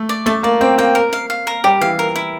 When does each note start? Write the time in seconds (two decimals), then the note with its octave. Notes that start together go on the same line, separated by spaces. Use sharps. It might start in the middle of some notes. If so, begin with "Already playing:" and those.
Already playing: A3
0.09 D5
0.26 A3 A5
0.43 A#3 D5
0.61 C4 G5
0.78 A#3 G5
0.95 A#4
1.13 F5
1.30 F5
1.47 A#4
1.64 G3 G4
1.81 E3 F5
1.99 A#4
2.16 E4